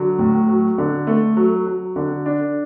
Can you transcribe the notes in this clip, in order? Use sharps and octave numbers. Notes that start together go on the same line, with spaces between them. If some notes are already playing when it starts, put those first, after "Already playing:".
Already playing: D3 F#3
A2
F#3
D3
A3
F#3
F#3
D3
D4